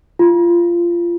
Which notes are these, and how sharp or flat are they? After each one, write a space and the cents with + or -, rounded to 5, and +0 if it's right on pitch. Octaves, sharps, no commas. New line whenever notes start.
F4 -20